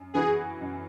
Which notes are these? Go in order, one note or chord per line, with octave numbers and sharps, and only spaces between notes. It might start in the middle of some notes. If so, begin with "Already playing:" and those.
Already playing: F#2
E3 B3 F#4 G#4
F#2